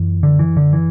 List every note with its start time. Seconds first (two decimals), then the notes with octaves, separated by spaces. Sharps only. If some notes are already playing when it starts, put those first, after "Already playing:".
Already playing: F#2 E3
0.23 D3
0.39 E3
0.57 D3
0.73 E3